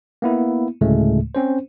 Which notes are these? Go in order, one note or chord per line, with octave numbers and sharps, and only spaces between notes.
A#3 B3 E4
D2 A2 C#3 G#3 A3
C4 C#4 C5